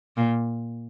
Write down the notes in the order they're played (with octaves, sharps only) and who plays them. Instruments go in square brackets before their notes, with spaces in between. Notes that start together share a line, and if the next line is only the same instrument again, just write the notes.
[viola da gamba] A#2